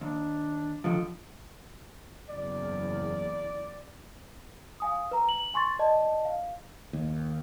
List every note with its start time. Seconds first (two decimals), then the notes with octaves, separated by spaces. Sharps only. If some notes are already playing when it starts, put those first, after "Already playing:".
0.01 D#2 D4
0.84 D3 D#3 F3
2.29 F#1 E2 D5
4.80 F5 G#5 D#6
5.11 B4 A#5
5.29 F#7
5.54 G#5 C6 C#6 A6
5.79 D5 D#5 A5
6.25 F5
6.93 D#2